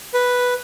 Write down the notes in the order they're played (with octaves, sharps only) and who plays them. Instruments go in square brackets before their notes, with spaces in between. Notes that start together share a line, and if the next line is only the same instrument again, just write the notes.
[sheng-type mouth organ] B4